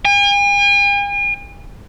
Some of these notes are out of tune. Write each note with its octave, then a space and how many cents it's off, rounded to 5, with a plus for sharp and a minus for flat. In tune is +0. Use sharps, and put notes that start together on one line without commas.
G#5 -45